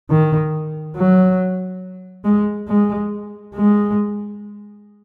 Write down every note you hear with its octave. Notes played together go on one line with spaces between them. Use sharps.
D#3
F#3
G#3
G#3
G#3